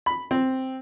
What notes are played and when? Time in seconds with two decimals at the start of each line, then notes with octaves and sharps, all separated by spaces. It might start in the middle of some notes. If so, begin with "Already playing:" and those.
0.06 B5
0.31 C4